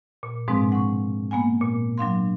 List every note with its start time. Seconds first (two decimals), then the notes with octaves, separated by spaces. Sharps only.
0.23 A#2
0.48 G#2 B2 F3 G#3 C4 D4
0.72 F#5 C#6
1.31 A#3 B3 F#5 G#5
1.61 A#2
1.98 F#3 D4 F5 C6